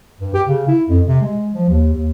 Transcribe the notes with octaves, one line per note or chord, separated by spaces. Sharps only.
G2
G4
C#3
E4
F2
C3
G#3
F3
D#2
D#2